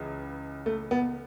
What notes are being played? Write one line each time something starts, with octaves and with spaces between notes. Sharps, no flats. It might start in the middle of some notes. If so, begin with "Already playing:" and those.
Already playing: C#2 C#3 E3
A3
B3